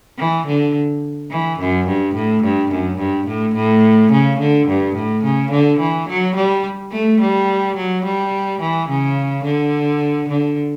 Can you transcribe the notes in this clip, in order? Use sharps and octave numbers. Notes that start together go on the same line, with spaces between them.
E3
D3
E3
F#2
G2
A2
G2
F#2
G2
A2
A2
C#3
D3
G2
A2
C#3
D3
E3
F#3
G3
A3
G3
F#3
G3
E3
C#3
D3
D3